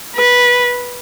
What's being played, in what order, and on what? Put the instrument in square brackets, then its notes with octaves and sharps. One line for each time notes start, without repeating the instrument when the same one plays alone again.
[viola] B4